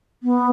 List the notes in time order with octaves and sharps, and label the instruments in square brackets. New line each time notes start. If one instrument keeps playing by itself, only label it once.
[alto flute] B3